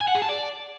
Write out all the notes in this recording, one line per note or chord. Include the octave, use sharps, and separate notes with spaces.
G#5
F#5
G#4
A5
D5